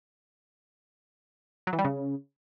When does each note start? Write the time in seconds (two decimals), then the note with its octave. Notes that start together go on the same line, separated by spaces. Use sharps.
1.67 F#3
1.73 E3
1.79 G3
1.84 C#3